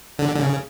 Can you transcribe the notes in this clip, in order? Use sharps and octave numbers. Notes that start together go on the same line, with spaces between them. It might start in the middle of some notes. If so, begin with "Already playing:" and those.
D3
D3
C#3